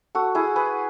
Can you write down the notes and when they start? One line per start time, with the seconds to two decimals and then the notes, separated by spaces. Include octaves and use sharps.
0.15 F#4 A4
0.35 E4 G#4
0.56 G#4 B4